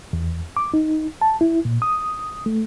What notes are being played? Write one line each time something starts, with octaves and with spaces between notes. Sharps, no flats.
E2
D6
D#4
A5
E4
A#2
D#6
A3